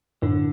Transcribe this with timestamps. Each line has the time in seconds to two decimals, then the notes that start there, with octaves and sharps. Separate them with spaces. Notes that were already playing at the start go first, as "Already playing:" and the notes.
0.22 F#2 A2 D3